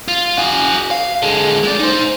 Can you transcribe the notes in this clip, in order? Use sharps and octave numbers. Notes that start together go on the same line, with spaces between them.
F4
F#4 G#4
F5
D3 G#3
G#3 D5
D#4 C5